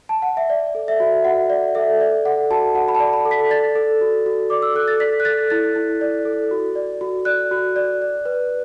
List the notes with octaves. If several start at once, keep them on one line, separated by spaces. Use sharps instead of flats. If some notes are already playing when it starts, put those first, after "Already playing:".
A5
F#5
E5
D5
A4
E5
F#4
F#4 F#5
D5
A4 E5
D5
A4 F#5
F#4 A5
F#4 F#5
B5
A5
D5
B5
A4
B6
D5 A6
A4
F#4
F#4
D5 D6
E6
A4 F#6
A6
D5 B6
F#6
A4 A6
E4 A6
E4
D5
A4
F#4
D5
F#4
D5 F#6
F#4
D5
D5
B4